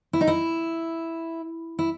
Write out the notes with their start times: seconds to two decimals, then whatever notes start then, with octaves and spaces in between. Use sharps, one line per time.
0.13 E4
0.21 D#4
0.27 E4
1.79 E4